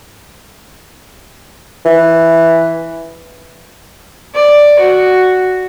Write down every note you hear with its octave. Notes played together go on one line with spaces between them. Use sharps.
E3
D5
F#4